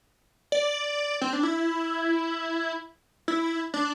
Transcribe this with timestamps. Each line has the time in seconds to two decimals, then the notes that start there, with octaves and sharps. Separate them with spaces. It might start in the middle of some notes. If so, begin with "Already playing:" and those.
0.52 D5
1.21 C4
1.33 D4
1.43 E4
3.28 E4
3.74 D4